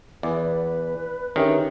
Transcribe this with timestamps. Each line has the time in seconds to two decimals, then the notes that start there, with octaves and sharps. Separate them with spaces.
0.23 E2 B4 D5 G#5
1.36 D#3 C#4 D4 G4 G#4 E5